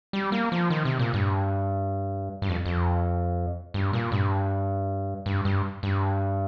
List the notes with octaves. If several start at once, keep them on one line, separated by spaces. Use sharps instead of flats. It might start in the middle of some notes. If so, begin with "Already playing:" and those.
G3
A#3
F3
D#3
C3
A#2
G2
G2
F2
F2
G2
A#2
G2
G2
G2
G2